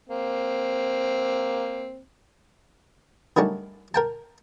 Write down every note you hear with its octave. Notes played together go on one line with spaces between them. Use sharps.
A#3 C4
D#3 F#3 G3 A3 C#4 D4
A#4 G5 A5